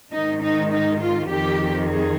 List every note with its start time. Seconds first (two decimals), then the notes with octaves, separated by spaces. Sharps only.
0.13 G#2 D#3 D#4
0.42 D#4
0.72 D#4
1.01 F4
1.30 F2 D#3 G4
1.88 G#4